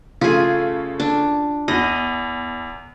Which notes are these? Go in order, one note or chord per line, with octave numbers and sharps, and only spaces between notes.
C#3 A3 F4 G#4
D4
E2 D#5